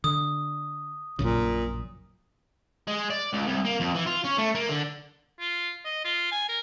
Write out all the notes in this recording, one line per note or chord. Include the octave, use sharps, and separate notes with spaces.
D3 D#6
A#1 F#2 A#2 C#3
G#3
D5
C#2
C2
A#3
F2
E3
F4
C#4
A3
A#3
D3
F4
D#5
F4
G#5
A#4